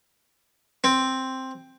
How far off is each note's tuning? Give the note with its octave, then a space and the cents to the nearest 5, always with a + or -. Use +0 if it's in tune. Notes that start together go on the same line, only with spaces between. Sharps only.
C4 +5